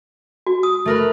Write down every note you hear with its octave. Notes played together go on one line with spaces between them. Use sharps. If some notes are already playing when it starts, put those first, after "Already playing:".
F#4
D#6
A3 A#4 B4